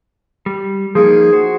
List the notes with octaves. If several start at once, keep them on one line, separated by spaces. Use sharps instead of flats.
G3
F3 A#3 D#4 G#4
F#4 C5